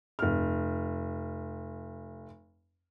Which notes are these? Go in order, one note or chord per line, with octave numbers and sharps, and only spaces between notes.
F1 F6